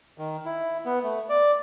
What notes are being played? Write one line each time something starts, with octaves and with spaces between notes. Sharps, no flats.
D#3
E4
B3
A3
D5